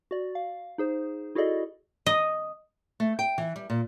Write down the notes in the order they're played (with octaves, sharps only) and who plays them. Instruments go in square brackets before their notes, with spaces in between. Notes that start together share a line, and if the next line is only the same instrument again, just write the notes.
[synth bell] F#4 D5
F5
D#4 G#4 C5
E4 F#4 G#4 A4 D5 D#5
[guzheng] D#5
[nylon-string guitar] A3
G5
E3
G3
A#2